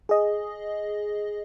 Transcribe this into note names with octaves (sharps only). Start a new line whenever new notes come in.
G#4 D#5